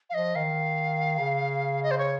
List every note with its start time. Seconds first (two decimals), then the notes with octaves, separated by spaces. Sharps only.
0.09 F5
0.14 F3 D#5
0.35 D#3 F5
1.19 C#3
1.82 D#5
1.91 C5
1.98 C#5